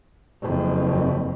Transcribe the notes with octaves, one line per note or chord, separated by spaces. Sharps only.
F#1 F2